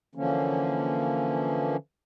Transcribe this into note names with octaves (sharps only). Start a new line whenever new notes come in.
D3 E3 F3 A#3 C#4